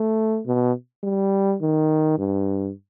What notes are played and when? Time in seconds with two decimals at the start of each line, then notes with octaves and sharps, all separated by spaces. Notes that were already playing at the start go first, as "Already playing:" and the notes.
Already playing: A3
0.46 B2
1.03 G3
1.62 D#3
2.18 G2